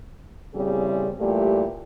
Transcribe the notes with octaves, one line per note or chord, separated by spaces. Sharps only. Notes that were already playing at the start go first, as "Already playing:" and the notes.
E2 A2 C#3 G3 C4 G#4
A#2 E3 G3 A3 G4